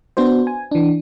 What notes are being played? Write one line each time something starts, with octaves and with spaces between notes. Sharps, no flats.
B3 D4 F#4 C5
G#5
E3 D4